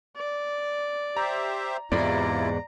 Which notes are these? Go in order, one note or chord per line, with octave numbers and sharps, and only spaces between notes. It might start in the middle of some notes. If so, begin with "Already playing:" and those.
D5
G4 C5 E5 A#5
E2 G#2 C3 E4 F4 D5 A#5